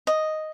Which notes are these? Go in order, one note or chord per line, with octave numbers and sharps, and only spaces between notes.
D#5